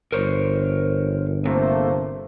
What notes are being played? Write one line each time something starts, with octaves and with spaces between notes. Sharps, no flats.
G1 A#4 C5 C#5
C3 A3 A#3 C5